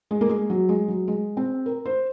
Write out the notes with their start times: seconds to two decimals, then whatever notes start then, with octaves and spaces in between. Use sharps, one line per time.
0.11 G#3
0.21 A#3
0.29 G#3
0.50 F#3
0.69 G#3
0.88 F#3
1.08 G#3
1.37 C4
1.66 A#4
1.85 C5